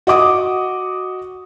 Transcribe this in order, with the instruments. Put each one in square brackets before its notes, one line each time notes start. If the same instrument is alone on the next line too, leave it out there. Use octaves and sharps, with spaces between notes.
[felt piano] F#4 D#5 D6 D#6